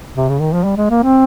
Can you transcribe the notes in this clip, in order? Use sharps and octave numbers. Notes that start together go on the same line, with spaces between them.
C3
C#3
D#3
F3
G3
G#3
A#3
C4